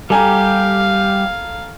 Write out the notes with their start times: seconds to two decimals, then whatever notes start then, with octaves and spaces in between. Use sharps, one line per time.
0.10 G3 G4 A4 F5 G#5 A#5